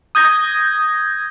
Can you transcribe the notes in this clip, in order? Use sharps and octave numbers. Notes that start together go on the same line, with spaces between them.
D#6 G6 G#6 A#6